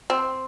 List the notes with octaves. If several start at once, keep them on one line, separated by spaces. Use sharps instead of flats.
C4